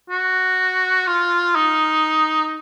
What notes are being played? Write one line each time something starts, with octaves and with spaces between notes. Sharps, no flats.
F#4
F4
D#4